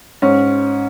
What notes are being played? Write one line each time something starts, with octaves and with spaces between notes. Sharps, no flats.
G#2 C#4